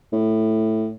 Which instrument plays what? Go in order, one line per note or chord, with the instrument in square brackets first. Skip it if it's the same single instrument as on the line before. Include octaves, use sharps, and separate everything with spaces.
[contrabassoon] A2